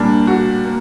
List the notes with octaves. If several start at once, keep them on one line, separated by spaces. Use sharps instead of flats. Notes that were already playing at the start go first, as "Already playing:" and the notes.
Already playing: A#2 G3 A#3 D4
F#4
A#3